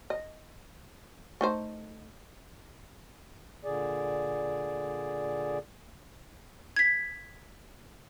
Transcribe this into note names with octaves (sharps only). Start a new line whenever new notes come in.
D#5
A3 D#4 C5
A#2 D3 G#4 D5
G#6 B6